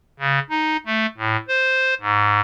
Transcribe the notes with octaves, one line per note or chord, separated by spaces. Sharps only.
C#3
D#4
A3
A2
C5
G#2